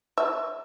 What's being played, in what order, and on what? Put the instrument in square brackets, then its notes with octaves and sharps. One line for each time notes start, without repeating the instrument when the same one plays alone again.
[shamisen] E5